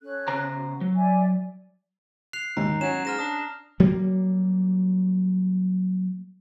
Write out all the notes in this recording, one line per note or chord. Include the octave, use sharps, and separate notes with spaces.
C#4 A4 F#6
C#3 C5 A#5
F#4
F#3
D5 E5 G#5
F#6 C7 F7
D#2 G#2 A#5
F#3 C#4 E7
G#2 F6 A#6 E7
D4 D#6
F#3 G3 A#3